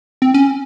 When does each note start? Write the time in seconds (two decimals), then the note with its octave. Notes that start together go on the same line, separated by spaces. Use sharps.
0.22 C4
0.34 C#4